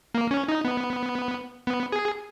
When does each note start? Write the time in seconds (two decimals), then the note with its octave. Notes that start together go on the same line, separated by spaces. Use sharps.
0.15 A#3
0.31 C#4
0.48 D#4
0.65 B3
1.67 B3
1.92 G#4